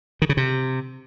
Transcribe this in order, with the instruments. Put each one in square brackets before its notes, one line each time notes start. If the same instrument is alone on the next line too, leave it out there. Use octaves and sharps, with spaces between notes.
[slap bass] D#3
C#3
C3